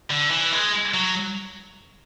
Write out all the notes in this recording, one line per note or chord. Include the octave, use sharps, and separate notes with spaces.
D3
E3
G#3
F#3